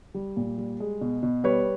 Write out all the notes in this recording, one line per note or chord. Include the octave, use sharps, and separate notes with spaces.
G3
A#2
G3
G#3
B2
B2
G3 B4 C#5